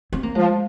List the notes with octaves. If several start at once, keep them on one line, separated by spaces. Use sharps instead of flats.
C4
A#3
F3 G#3